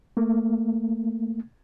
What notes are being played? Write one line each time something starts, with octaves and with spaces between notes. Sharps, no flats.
A3 A#3